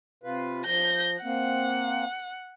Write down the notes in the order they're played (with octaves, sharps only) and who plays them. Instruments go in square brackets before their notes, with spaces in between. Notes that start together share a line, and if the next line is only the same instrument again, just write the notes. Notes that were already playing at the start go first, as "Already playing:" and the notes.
[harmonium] C3 F4 B4
[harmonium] F3 [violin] G6 A#6
[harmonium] A#3 C4 [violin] F#5